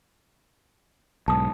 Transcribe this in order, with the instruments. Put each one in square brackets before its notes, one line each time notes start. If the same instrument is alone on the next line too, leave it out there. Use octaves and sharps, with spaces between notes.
[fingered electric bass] B1 G#2 [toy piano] A5 D#6